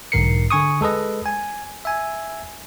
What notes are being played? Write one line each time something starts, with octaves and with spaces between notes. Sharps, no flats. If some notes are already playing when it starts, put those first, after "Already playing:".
B1 G#2 D3 A#4 C7 C#7
D3 G#5 C#6 D#6
G#3 A4 B4 D#5
G#5
E5 G#5